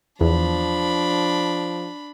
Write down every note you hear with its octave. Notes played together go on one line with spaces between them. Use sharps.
E2 F3 D4 B5